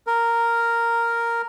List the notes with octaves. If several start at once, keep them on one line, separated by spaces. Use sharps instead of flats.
A#4